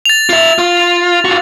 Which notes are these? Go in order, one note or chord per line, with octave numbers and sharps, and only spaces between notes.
A6 F7
F4 E5
F4
F4 F#4